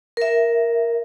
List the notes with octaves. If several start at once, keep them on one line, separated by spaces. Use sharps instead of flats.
A#4 E5